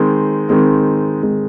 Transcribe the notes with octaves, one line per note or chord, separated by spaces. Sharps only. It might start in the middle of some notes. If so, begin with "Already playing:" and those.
Already playing: D#3 G#3 C4
D#3 G#3 C4
D#3 G#3 C4